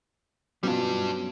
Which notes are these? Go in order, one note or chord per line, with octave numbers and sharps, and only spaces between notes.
B2 F#3 G3 C#4 D4 F4